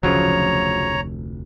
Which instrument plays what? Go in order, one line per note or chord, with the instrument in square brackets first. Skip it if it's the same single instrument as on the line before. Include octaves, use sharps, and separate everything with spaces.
[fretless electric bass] F1 D2 [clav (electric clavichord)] C#3 F3 F#3 [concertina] C#5 A#5